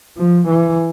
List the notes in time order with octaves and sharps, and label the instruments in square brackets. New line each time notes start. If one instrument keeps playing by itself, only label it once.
[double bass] F3
E3